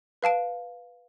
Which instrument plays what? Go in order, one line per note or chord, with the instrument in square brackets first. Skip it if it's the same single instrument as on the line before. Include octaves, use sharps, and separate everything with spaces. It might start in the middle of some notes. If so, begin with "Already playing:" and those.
[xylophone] B4 F5 A5 D7